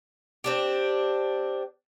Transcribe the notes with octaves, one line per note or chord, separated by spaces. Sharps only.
C4 D4 G4